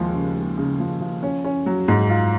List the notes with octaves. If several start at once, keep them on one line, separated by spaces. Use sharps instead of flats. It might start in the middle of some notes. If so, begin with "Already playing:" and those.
Already playing: D#2 F3 G#3
C#3
G#3
C#3
F3
F3
C#4
C#4
F#3
G#2
F4